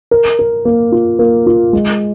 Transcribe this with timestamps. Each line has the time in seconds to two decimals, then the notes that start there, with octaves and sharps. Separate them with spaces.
0.11 A#4
0.39 A#4
0.65 A#3
0.92 F4
1.19 A#3
1.46 F4
1.73 G#3